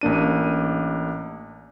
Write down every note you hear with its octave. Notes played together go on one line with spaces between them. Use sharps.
A1 A#3 D4 D#7